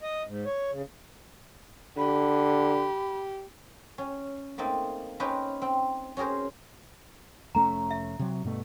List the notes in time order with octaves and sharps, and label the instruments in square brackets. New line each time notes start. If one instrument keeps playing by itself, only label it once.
[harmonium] D#5
G#2
C#5
C#3
[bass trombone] D3 [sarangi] G4 [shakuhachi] B5
[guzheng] C#4
A3 A#3 C4 D#4
C#4 D#4 B4 C5 F#5 G5
C4
C#4 F#4 G#4 A#4 C5
[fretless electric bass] F1 A3 C#4 [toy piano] A#5
[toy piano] E5
[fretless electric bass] C3 F#3
G2 B2 A3